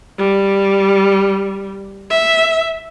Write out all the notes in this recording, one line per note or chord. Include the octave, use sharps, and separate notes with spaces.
G3
E5